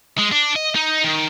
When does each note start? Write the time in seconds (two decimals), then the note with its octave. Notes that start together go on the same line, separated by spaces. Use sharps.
0.19 G#3
0.32 D4
0.56 D#5
0.76 D#4
1.04 D#3